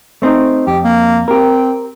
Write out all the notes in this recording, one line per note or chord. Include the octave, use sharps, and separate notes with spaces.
A3 C4 D#4
F2 G4
A#3
C4 G4 A#4